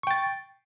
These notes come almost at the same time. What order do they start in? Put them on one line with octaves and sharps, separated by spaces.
C#6 G5 A6